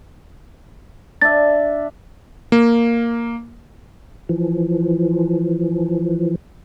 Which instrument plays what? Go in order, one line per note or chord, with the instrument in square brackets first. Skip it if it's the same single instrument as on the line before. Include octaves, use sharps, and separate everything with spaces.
[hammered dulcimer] D4 E5 [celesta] A6
[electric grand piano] A#3
[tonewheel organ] E3 F3